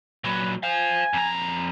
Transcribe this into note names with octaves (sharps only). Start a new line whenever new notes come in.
A#2 F#3 B4
C5 F5 G#5
F2 A#5